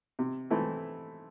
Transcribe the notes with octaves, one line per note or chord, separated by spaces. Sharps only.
C3
E3 A3 C4 E4